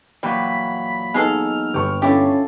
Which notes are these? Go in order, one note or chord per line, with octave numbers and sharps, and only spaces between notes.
A#2 E3 F#3 G3 B5
G#3 B3 D#4 G#4 A4 F6
G1 G4 C#6
C#4 D4 E4 F4 G4 A4